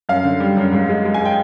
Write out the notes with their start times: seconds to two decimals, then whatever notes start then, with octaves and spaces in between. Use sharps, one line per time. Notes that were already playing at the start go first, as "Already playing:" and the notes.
0.09 F#2 F5
0.24 D3
0.40 G3
0.57 F#2
0.72 G#2
0.89 G#3
1.05 G#3
1.14 G#5
1.21 G#3 G5